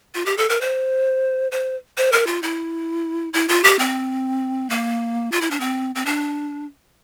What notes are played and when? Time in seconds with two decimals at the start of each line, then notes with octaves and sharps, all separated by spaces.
0.15 F4
0.26 G4
0.37 A4
0.49 A#4
0.61 C5
1.52 C5
1.97 C5
2.12 A#4
2.27 F4
2.43 E4
3.33 E4
3.48 F4
3.64 G4
3.79 C4
4.70 A#3
5.32 F4
5.41 E4
5.51 D4
5.60 C4
5.95 C4
6.06 D4